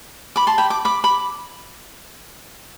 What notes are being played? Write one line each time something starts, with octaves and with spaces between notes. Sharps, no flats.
B5 D6
A5 C6
G5 B5
D6
B5 D6
B5 D6